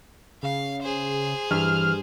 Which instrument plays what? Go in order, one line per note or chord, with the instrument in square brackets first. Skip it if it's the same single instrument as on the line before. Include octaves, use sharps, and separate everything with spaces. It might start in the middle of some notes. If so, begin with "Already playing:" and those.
[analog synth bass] C#3 [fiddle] F5
[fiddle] G#4 C5
[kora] G2 [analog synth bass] E3 [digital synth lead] F6